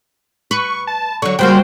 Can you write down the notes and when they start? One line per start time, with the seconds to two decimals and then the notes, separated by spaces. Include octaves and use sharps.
0.51 B4 C#6
0.87 A5
1.22 D3 F#3 C#6
1.39 C#3 G3 A#3 F#4 C5 G5